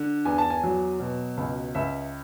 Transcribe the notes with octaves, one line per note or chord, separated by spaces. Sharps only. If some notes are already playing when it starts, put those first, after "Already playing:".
Already playing: D3
E2 G#5
A5
G#5
F#3
B2
C#2
C#2 E5